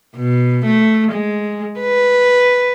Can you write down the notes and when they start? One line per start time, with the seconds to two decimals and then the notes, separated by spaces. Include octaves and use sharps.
0.16 B2
0.66 A3
1.12 G#3
1.80 B4